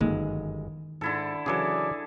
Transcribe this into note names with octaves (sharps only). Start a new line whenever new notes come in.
G1 F#2 D#3 E3 G#3
G#2 D3 E4 A4
C#3 E3 F#3 G#4 A4 D5